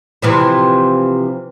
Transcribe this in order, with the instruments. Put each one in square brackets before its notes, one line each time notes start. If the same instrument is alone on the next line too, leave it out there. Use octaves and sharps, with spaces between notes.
[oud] C3 E3 F3